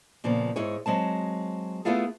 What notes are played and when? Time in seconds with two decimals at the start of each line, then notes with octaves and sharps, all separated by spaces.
0.24 A#2 C#3 F3 B3
0.56 G#2 E4 G#4 C#5
0.86 F#3 G#3 C4 A5
1.85 A3 B3 E4 F4 G#4 A4